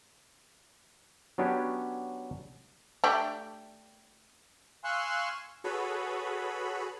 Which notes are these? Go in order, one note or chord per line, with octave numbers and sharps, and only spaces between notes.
F#3 B3 C#4 D4 G4 C#5
A3 D4 G4
F5 G#5 C6 C#6 E6 F#6
F#4 G#4 A4 B4 C#5 B5